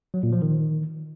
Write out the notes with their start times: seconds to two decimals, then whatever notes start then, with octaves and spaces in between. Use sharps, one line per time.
0.14 F#3
0.23 A#2
0.32 F3
0.42 D#3